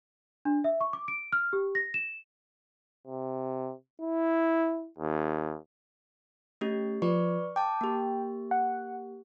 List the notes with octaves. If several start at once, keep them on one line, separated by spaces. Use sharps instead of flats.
D4
E5
C#6
D6
D7
F6
G4
A#6
E7
C3
E4
D#2
A3 C#4 G4
F3 B4 D5 C#6
G5 A5 D6
A#3 G4
F#5